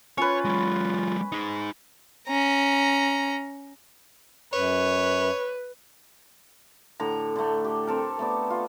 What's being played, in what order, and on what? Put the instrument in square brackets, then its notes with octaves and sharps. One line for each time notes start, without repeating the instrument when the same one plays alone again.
[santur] C#4 B4 [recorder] F4 [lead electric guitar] C#5
[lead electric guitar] F#3 G#3
D#4 G#4
[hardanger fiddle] C#4 A#5
[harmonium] F#2 [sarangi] B4 [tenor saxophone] C#5
[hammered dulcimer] A2 D3 A#5
D3 A3
G4
C4 A4 A#4
A3 B3 D5
F4